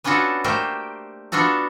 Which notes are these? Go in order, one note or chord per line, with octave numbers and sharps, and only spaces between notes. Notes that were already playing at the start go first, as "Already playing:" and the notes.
B3 C#4 D4 F4 F#4 A4
A3 A#3 G4 A#4 C5 G5
B3 D4 F4 F#4 A4